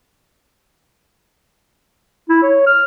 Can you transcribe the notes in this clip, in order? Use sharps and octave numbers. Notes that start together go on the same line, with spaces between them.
E4
C#5
F6